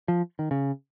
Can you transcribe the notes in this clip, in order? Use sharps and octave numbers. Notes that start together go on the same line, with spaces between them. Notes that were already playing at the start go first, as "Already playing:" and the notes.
F3
D#3
C#3